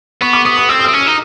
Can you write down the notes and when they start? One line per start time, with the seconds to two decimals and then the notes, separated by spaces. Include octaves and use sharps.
0.21 B3 C#6
0.33 D6
0.45 B3 D#6
0.58 D#6
0.69 C4 E6
0.80 D#6
0.84 C4 E6
0.93 C#4
1.01 F6
1.07 D#4